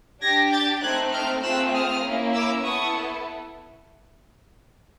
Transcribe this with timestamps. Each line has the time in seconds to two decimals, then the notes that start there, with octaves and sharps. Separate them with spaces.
0.21 D4 G4 G#6 A#6
0.52 G6 A6
0.81 A3 C4 D#4 F#6 G#6
1.12 F6 G6
1.43 A3 C4 F4 G#4 E6 F#6
1.73 D#6 F6
2.04 A#3 C#4 E4
2.34 D6 E6
2.64 B3 E4 A4 C#6 D#6